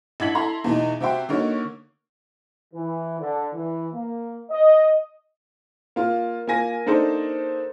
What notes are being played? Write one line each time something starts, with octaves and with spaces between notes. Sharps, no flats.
A1 D4 E4 G#6 B6 F#7
E4 A4 A#5 C6
E2 B2 D#4
C3 C4 F#4 E5 G5 C6
D3 A#3 D#4 F#4 A#4 C#5
E3
D3
E3
A#3
D#5
A#3 F4
A#3 F4 G#5 A#6
A#3 D4 D#4 A4 C5